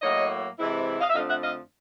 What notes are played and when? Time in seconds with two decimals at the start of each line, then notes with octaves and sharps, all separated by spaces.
0.01 A2 F#3 A#3 C#5 D#5
0.58 C3 E3 G#3 C4 E4
1.00 D#5 F5
1.09 E5
1.14 F2 D3 F3 A3 D4 D#5 F5
1.29 E5 F#5
1.42 D#5 F5